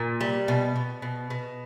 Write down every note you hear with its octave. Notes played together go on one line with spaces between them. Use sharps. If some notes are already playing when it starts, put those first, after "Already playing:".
Already playing: A#2
G3
B2
B2
B2
B2